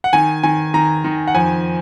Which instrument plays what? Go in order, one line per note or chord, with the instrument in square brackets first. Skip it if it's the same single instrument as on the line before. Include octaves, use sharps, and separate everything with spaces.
[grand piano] F#5
D#3 G#5
D#3 G#5
D#3 A#5
D#3
F#5
F2 G#5